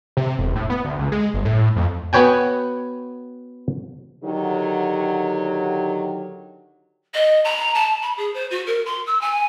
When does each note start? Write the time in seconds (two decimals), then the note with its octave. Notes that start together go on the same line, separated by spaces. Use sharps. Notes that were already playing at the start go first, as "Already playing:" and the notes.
0.17 C3
0.39 E1
0.56 A2
0.70 B3
0.85 D2
0.99 C#2
1.12 G#3
1.34 G1
1.45 A2
1.76 F2
2.13 B3 F#4 B4 C#5 G5 G#5
4.24 D3 D#3 F#3 G4
7.14 D#5
7.45 A#5
7.75 A5
8.02 B5
8.17 G#4
8.34 C5
8.51 F#4
8.67 A#4
8.86 C6
9.07 E6
9.21 G#5